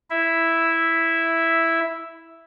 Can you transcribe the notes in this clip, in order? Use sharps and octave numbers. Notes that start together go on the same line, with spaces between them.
E4 E5